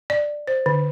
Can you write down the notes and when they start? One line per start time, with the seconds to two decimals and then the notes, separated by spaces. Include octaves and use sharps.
0.10 D5
0.47 C5
0.66 D3